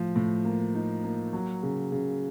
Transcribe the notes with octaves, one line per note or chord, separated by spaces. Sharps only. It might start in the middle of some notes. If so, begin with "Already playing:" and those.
Already playing: A2 F3
A2
A#3
D#4
A#3
F#3
C#3
C#3